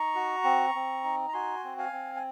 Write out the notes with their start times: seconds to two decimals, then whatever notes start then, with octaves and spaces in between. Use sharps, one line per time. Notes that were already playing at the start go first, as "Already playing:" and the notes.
Already playing: D#4 A#5 C#6
0.15 F#4
0.44 C4
0.75 C4
1.04 D#4
1.28 A#5
1.33 F#4 G#5 C6
1.64 C4
1.78 F5 G#5
1.92 C4
2.15 G#5